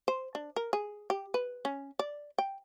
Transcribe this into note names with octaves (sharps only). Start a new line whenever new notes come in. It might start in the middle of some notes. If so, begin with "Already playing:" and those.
C5
D4
A#4
G#4
G4
B4
C#4
D5
G5